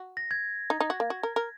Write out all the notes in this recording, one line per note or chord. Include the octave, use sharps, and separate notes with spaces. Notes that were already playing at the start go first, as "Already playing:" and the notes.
Already playing: F#4
A#6
G#6
D#4
D#4
F#4
A#3
F#4
A#4
A#4